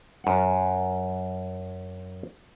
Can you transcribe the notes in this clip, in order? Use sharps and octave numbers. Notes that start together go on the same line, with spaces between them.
F#2 F#5